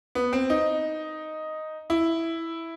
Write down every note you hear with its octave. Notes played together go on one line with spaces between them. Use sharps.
B3
C4
D#4
E4